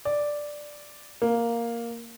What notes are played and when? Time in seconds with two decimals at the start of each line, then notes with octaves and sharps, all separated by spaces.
0.05 D5
1.22 A#3